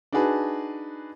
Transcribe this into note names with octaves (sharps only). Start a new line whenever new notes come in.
D4 D#4 F#4 G#4 B4 A5